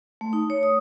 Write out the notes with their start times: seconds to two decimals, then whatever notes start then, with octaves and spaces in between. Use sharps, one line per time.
0.21 A3
0.33 D#4
0.50 C#5
0.63 D#6